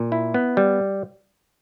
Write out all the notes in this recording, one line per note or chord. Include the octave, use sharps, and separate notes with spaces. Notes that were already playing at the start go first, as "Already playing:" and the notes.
Already playing: A#2
E4
B3
G3